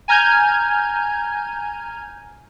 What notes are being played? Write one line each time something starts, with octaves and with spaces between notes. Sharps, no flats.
G#5 A#5 F6 G6 G#6